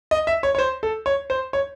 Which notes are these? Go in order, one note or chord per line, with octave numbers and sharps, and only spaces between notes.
D#5
E5
C#5
C#5
C5
A4
C#5
C5
C#5